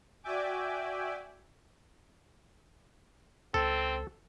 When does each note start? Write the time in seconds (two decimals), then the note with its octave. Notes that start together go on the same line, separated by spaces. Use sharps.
0.23 F#4 D5 E5 G5 G#5 D6
3.54 C#2 C4 A4